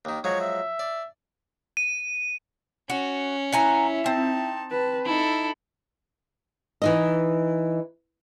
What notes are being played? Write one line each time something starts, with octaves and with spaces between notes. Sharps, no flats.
D#2 D#3
F3 F#3 G#3 C#5
E5
D5
D#7
C#4 F#4
E4 E5 F#5 G#5 A#5
C4 D#4 A5
B4 A5
D#4 E4 A4
E3 D#4 D#5